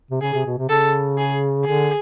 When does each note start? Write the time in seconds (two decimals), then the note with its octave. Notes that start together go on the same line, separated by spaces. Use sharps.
0.11 C3
0.22 C#3 G#4
0.34 C3
0.46 B2
0.58 C3
0.69 C#3 A4
1.18 G#4
1.65 D3 G#4